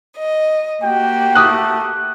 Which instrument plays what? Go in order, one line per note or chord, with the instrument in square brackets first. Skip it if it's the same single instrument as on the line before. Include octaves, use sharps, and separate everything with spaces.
[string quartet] D#5
[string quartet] A#3 F#4 G4 [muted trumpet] G5
[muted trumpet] A3 [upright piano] D6 D#6 F#6